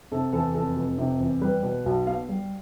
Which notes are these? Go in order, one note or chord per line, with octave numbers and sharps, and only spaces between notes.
C3 A4
E2 A4
F1 A4
F1
C3
E2
G3 B4
B2
B1
B3 F5
G3